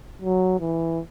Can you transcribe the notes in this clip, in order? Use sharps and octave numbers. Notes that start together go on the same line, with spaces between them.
F#3
E3